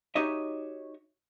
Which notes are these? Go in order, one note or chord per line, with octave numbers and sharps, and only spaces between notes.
D#4 F#4 G4 C#5 D#5 E5